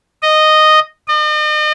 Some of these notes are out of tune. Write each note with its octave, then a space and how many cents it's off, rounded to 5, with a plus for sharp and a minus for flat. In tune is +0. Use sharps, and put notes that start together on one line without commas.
D#5 -10
D#5 -40